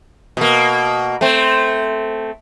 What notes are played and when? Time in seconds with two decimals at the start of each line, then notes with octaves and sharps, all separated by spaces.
0.37 B2 A#3
1.21 A3 C4